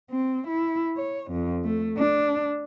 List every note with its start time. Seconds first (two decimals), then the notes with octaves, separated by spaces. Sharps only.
0.11 C4
0.48 E4
0.97 C#5
1.31 F2
1.64 A3
1.97 D4